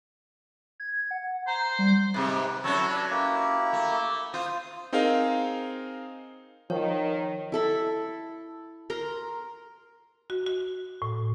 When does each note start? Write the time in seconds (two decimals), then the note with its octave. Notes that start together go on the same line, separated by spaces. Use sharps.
0.80 G#6
1.11 F#5
1.47 C5 A#5
1.79 G3
2.14 G#2 C3 B4
2.64 F#3 C#4 E4 F#4 A4
2.90 D4 B4
3.11 A#3 E4 G4
3.73 A3
4.34 F4 C5 D#6
4.93 C4 D#4 G#4 A#4 F5
6.70 D#3 F3 C#5
7.52 E4 A4 B5
8.90 A#4 A#5 C6
10.30 F#4
10.47 F#4
11.02 A2